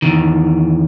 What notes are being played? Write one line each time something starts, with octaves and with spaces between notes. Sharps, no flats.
E2 D#3